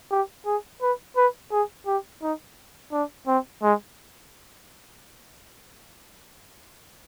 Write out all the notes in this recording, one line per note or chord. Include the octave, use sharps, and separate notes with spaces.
G4
G#4
B4
B4
G#4
G4
D#4
D4
C4
G#3